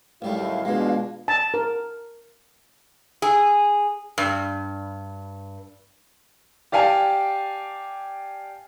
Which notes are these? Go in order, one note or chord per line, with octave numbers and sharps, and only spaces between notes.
A1 D#2 F#3 G3 A3 E4 F5
B2 E3 G#3 D4 F4
A5
A#4
G#4
G2
G4 D5 F5 G#5 A5